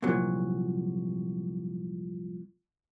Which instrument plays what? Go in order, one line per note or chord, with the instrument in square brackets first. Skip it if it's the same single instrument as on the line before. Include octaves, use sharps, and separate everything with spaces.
[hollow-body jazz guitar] C2 F2 A#2 F#3